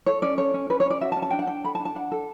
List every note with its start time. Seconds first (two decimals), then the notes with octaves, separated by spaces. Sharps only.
0.06 A4 C#5
0.22 C#4 D5
0.38 A4 C#5
0.54 C#4
0.70 C#4 B4
0.80 C#5
0.86 C#4 D5
1.01 F#4 E5
1.12 A5
1.17 C#4
1.22 A5
1.30 D4 G5
1.39 F#5
1.47 D4 G5
1.64 A4 B5
1.75 A5
1.80 D4
1.85 A5
1.95 D4 F#5
2.12 A4